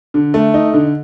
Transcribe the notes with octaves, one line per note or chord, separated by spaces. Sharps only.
D3
A3
D#4
D3